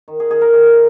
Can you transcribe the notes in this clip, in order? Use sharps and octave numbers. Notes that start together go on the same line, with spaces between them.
D#3
G#4
D#3 G#4
A#4
D#3 G#4